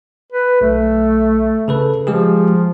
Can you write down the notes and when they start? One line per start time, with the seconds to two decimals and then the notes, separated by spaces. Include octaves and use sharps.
0.33 B4
0.61 B1 A3
1.68 C#3 A4 B4
2.07 F3 G#3 G4 G#4